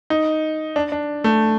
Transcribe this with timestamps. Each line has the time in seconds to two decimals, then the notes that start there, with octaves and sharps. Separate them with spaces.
0.10 D#4
0.76 D4
0.92 D4
1.24 A3